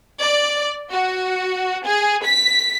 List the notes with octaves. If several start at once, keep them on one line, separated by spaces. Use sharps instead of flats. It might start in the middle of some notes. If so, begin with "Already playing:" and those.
D5
F#4
G#4
B6